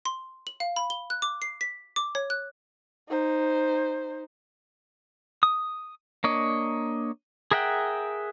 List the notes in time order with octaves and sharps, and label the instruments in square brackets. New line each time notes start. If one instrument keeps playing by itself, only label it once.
[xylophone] C6
F#7
F5
B5
G7
F#6
D6
C7
B6
D6
C#5
F#6
[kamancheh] D#4 C5
[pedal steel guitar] D#6
A#3 D4 C#5 D#5
G#4 A#4 E5 F#5 G5